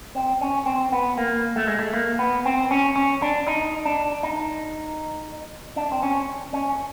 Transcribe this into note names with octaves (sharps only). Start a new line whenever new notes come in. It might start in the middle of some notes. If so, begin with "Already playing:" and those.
C4
C#4
C4
B3
A#3
A3
G#3
A3
A#3
B3
C4
C#4
C#4
D4
D#4
D4
D#4
D4
C4
C#4
C#4